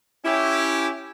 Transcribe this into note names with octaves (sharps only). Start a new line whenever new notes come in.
C#4 E4 G4